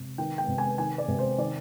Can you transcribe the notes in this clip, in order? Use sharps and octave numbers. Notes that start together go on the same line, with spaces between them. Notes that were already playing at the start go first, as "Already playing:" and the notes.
Already playing: C3
D#3 G5
G5
C3
G#5
D#3 G#5
D5
C3
C5
D#3 D5